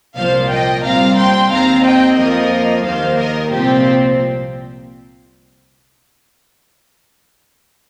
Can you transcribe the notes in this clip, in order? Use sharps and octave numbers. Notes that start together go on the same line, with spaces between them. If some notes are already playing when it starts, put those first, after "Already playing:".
C2 A#2 F3 A#3 C5 F5
D#5 G5
A#2 G3 C4 F5 A#5
G5 C6
D#2 D#3 C4 F5 A#5
D#5 G5
F2 F3 A#3 A#4 D#5
D#2 D#3 A#3 C5 F5
A#4 D#5
C2 A#2 F3 C4 G4 C5